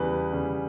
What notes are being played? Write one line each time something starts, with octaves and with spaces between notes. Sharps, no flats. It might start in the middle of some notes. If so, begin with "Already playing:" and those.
Already playing: E2 C#3 G3 B4
E2 C#3 G3